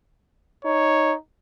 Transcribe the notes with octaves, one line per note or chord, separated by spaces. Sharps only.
D#4 C#5